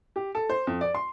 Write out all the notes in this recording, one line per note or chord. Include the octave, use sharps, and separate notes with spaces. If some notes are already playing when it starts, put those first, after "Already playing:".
G4
A4
C5
F2
D5
C6